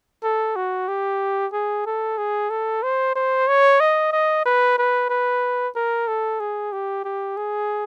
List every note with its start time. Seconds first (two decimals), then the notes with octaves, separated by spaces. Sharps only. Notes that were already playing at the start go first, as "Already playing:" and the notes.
0.23 A4
0.56 F#4
0.88 G4
1.53 G#4
1.86 A4
2.18 G#4
2.50 A4
2.83 C5
3.16 C5
3.48 C#5
3.80 D#5
4.12 D#5
4.45 B4
4.78 B4
5.10 B4
5.76 A#4
6.08 A4
6.40 G#4
6.72 G4
7.05 G4
7.37 G#4